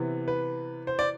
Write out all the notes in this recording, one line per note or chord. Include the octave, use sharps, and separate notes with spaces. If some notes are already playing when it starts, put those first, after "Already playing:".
Already playing: C3 E3 B3
B4
C5
D5